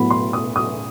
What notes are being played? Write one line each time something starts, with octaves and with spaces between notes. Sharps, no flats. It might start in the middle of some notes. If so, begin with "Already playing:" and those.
Already playing: A2 F#3 B3 B5
C6
D#6
D#6